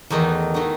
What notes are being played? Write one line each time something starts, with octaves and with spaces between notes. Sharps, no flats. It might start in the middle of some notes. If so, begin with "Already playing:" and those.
E2 D#3 A3 D#4 F#4
D#3 A3 D#4 F#4